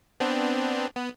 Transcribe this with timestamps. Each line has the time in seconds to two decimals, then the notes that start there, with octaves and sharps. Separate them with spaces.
0.20 B3 C4 D4
0.95 B3